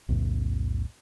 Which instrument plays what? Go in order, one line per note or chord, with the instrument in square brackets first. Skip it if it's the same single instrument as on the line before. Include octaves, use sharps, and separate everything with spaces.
[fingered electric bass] B1 E2 A2 C#3